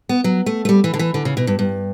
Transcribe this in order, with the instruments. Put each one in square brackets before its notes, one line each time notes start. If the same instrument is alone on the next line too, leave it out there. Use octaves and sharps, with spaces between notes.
[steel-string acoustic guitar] B3
F#3
A3
A3
G3
E3
D3
E3
D3
C#3
B2
G2
G2